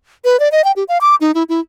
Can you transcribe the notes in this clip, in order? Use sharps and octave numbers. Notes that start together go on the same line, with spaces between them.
B4
D5
D#5
G5
G4
F5
D6
D#4
E4
E4